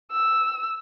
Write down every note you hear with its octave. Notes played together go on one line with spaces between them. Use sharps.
E6